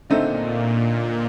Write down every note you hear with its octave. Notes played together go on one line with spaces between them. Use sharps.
A#2 D3 A3 C4 D#4